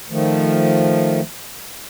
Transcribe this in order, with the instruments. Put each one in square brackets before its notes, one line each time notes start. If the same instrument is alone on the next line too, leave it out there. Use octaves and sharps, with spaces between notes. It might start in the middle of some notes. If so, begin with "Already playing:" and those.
[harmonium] D#3 F3 A3